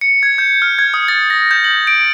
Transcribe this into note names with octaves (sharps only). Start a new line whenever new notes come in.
C#7
G#6
G6
F6
G#6
D#6
A6
A#6
G6
F#7
D7